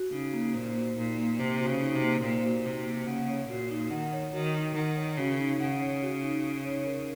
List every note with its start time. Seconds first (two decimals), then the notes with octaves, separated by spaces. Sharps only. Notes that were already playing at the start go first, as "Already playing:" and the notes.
Already playing: F#4
0.12 C#3 D#4
0.33 A#3
0.54 A#2 C5
0.76 F#4
0.96 A#2 D#4
1.17 A#3
1.39 C3 C5
1.59 F#4
1.66 C#3
1.80 D#4
1.95 C3
2.02 A#3
2.22 A#2 C5
2.44 F#4
2.65 C3 D#4
2.86 A#3
3.06 C#3 F#5
3.29 C#5
3.49 A#2 F#4
3.71 D#4
3.91 D#3 F#5
4.13 C#5
4.33 D#3 F#4
4.55 D#4
4.75 D#3 F#5
4.96 C#5
5.17 C#3 F#4
5.39 D#4
5.60 C#3 F#5
5.81 C#5
6.02 F#4
6.22 D#4
6.44 D#4
6.64 C#5
6.86 A#4